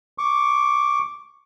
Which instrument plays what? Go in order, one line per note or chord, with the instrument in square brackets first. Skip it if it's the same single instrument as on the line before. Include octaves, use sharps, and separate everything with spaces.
[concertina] C#6 D6